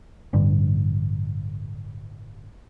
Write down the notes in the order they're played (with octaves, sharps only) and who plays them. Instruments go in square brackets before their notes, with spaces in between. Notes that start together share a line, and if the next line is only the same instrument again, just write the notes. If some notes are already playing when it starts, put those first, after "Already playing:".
[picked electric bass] A1 G2 D3